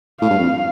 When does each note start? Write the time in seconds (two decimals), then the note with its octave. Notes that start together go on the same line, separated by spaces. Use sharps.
0.21 A2 F5
0.30 G2
0.39 F2